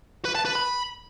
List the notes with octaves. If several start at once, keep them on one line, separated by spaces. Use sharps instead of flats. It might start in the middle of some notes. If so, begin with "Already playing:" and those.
B4
A5
B4
B5